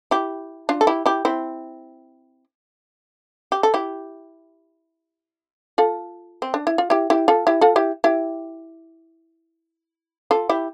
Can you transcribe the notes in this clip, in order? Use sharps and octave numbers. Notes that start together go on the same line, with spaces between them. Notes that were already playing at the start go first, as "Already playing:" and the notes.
E4 G4
D4 F4
A4
E4 G4
E4 G4
C4 E4
G4
A4
E4 G4
F4 A4
C4
D4
E4
F4
E4 G4
E4 G4
F4 A4
E4 G4
F4 A4
E4 G4
E4 G4
F4 A4
E4 G4